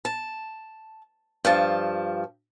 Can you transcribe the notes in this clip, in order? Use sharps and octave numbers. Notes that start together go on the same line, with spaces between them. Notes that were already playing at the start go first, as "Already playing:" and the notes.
A5
G2 F3 A5